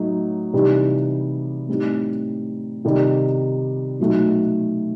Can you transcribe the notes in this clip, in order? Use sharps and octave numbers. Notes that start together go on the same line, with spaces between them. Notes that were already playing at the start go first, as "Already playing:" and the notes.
Already playing: A2 F#3 A3 D#4
C3 E3 G3 D#4
A2 G3 C4 D#4
C3 D#3 G3 D#4
B2 F#3 A3 D#4